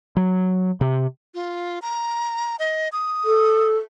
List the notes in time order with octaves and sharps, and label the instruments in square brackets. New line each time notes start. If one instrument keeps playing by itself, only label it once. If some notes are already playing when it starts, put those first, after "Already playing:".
[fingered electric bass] F#3
C3
[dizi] F4
A#5
D#5
D#6
[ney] A4